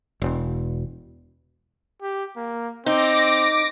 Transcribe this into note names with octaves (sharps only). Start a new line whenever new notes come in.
E1
G4
A#3
C4 D#4 D6 A#6